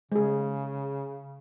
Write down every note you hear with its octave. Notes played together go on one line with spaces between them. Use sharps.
C#3 G#3 G#4